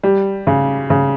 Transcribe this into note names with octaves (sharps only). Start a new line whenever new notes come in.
G3
C#3
C#3